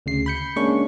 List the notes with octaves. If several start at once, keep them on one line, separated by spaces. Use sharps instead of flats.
D2 C#3 C7
B5 G6 C#7
G#3 A#3 C#4 D4 C#6